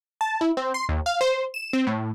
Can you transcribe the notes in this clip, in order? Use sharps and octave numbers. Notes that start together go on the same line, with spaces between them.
A5
E4
C4
C6
D#2
F5
C5
E7
C4
A2